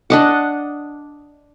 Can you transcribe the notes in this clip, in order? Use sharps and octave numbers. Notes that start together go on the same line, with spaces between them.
D4 D#5 F#5